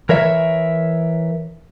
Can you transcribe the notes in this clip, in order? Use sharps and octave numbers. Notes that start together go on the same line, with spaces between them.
E3 A#4 C#5 E5